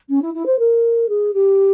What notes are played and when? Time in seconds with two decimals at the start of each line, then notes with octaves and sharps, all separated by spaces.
0.09 C#4
0.22 E4
0.34 E4
0.46 C5
0.59 A#4
1.09 G#4
1.34 G4